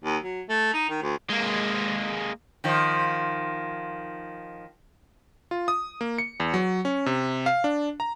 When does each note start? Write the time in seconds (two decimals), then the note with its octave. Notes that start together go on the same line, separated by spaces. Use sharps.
0.04 D#2
0.23 F#3
0.49 A3
0.74 D#4
0.90 D#3
1.02 D2
1.30 G#3 A#3
2.64 D#3 F3
5.51 F4
5.68 D#6
6.01 A#3
6.18 C#7
6.40 E2
6.54 F#3
6.85 C#4
7.06 C3
7.46 F5
7.64 D4
8.00 A#5